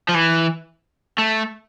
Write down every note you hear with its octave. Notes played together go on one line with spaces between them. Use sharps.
F3
E3
A3